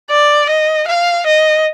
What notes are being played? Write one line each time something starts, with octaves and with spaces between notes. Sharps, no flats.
D5
D#5
F5
D#5